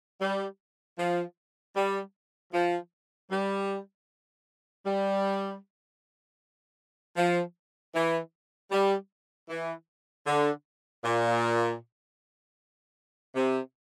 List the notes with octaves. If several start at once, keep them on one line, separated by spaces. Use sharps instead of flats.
G3
F3
G3
F3
G3
G3
F3
E3
G3
E3
D3
A#2
C3